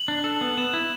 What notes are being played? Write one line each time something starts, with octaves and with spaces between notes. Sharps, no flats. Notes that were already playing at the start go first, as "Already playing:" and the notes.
Already playing: F#7
D4
A4
B3
B3 E7
E4